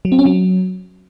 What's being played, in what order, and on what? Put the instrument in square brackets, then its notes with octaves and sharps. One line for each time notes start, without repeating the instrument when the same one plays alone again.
[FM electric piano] F#3
C4
C#4
F#3